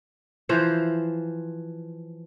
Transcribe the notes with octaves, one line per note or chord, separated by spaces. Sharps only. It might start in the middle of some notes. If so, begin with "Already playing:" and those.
E3 F3 C5